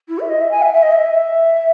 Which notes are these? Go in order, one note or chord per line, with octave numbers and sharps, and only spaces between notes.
E4
E5
D#5
E5
G#5
E5
E5
D#5
E5